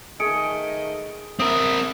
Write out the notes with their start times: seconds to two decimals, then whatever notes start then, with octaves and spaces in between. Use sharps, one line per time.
0.20 D#3 A3 G#4 D#5 C#7 D7
1.40 C4 A#4 E5 D#6